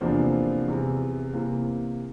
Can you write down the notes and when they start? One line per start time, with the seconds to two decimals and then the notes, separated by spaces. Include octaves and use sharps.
0.01 E2 C3 F3 A#3 D4 C5
0.68 E2 C3 E3
1.34 C3 E3 A#3